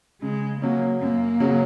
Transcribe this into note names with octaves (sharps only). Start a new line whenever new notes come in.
C#3 G#3
F#3 A#3 C#4
F#2 A#3
C#3 F#3 C#4 G#4